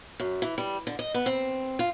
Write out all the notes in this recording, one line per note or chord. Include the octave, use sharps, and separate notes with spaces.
F#2
E3
G3
D3
D#5
B3
C4
F4